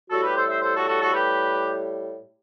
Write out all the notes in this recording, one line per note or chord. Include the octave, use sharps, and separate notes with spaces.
A2 G3 F#4 A4
G4 B4
A4 C5
C5 E5
A4 C5
F#4 A4
F#4 A4
F#4 A4
G4 B4